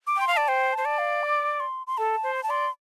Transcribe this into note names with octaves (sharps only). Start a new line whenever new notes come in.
D6
G5 C6
F5
D5 A5
C5 G5
C5 A5
D5
F5
D6
C6
C6
A4 A5
C5
C6
A5
D5 C6